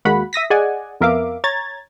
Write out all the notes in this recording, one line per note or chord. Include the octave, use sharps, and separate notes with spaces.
D#2 G#3 A#3 F#4 F#5 B5
E5 D#6 A#6 B6
G#4 D5 D#5 F#5 G#5
F2 B3 A#4 E5 F5 D6
C#5 A#5 G#6 A6